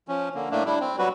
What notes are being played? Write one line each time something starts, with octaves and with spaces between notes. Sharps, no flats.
F3 C#4
D3 A#3
A2 A3 A#3 D4
G3 D4 E4
C4
F#3 G3 F#4 B4